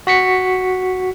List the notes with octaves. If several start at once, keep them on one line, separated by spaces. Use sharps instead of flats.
F#4 B6 C#7